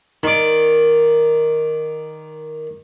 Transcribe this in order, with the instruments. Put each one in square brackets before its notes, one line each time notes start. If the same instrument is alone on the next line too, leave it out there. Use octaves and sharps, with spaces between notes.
[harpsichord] D#3 D5